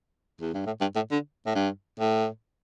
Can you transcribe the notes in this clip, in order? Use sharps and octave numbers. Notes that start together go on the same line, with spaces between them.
E2
G2
A2
G2
A2
D3
A2
G2
A2